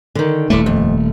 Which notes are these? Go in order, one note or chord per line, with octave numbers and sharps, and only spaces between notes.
D3 D#3
D#1 A3 D4 E4 D5
F2